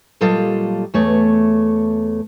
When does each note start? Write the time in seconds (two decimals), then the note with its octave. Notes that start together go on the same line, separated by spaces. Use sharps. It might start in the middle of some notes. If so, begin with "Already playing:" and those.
0.21 A#2 F#3 G3 F4 A4 D#5
0.94 E2 A3 C#5